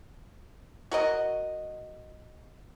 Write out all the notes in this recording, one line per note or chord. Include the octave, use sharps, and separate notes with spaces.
F#4 A#4 D#5